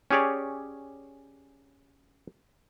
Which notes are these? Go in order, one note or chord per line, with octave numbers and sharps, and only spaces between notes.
C#4 G4 G#4 C#5 D5